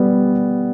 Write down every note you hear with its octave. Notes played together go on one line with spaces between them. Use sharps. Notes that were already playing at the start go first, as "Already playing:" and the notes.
Already playing: G3 B3